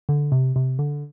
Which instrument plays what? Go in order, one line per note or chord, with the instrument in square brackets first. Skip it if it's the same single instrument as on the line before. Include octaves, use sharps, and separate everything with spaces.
[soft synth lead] D3
C3
C3
D3